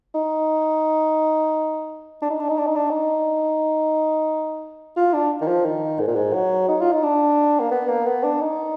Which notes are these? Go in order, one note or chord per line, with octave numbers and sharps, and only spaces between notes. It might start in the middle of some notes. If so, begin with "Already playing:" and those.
D#4
D4
D#4
D4
D#4
D4
D#4
D4
D#4
F4
D4
D#3
F3
D#3
G#2
A#2
G#2
F#3
D#4
F4
D#4
D4
A#3
B3
A#3
B3
D4
D#4